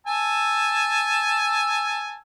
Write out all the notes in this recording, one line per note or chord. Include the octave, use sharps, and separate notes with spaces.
G#5 A5 E6